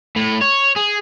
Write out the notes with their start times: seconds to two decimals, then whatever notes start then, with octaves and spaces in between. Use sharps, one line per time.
0.16 A2
0.41 C#5
0.76 G#4